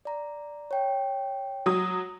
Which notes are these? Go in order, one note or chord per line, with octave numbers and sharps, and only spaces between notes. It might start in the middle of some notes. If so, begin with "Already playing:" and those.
D5 A#5
C#5 G5
F#3 D#6